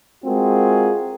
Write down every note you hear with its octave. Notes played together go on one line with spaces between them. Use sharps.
G#3 C4 F4 F#4 G#4 A#4